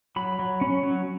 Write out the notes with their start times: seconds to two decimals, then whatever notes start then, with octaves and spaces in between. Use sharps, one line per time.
0.16 F#3 B5
0.39 F#3
0.61 C#4
0.83 F#3